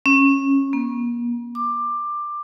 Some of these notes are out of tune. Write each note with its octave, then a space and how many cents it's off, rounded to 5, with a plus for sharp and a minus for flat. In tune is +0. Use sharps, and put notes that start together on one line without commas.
C#4 -15
A#3 +40
D6 +15